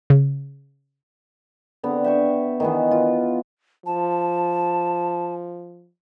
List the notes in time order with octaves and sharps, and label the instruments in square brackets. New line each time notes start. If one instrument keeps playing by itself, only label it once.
[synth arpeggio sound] C#3
[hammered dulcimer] D3 B3 C4
E5 G5 C#6
D#3 E3 B3
F4
[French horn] F3 [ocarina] A5